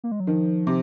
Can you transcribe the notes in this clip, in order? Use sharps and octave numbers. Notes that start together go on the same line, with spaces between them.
A#3
G#3
F#3
D#3 F3
C3